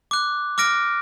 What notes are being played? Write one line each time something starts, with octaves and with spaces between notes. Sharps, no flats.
D6 F#6
D6 F6 A#6 D7